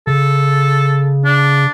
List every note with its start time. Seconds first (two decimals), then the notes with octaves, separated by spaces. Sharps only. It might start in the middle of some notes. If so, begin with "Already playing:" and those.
0.07 C#3 A4
1.25 D4